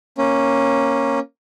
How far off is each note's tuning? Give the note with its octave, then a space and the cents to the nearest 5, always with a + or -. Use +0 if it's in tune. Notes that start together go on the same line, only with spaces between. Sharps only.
A#3 +0 C#4 -10